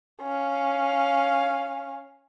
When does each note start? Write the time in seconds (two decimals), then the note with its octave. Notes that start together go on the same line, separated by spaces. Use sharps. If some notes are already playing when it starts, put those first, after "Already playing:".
0.23 C#4 F5